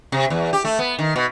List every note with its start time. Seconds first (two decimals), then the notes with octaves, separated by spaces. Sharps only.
0.12 C3
0.30 E2
0.53 G4
0.65 A3
0.79 B3
0.99 D#3
1.16 B2